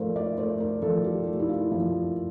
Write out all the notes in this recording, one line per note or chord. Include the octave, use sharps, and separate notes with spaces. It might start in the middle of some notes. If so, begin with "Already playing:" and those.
Already playing: F3 A3 A#4 C5 D5
D5
A3 C5
A#4
F3 A4
G4
A3
E4
F4
F3